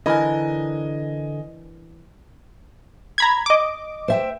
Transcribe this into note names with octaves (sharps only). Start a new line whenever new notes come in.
D3 E3 D4 A#4 D#5 G#5 B5
A#5 B5 G#6
D#5 D6
C5 E5 G5